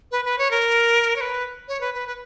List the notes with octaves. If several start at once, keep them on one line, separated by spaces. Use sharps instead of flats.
B4
B4
C#5
A#4
C#5
B4
C#5
B4
B4
B4